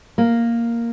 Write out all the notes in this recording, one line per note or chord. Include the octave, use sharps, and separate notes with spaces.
A#3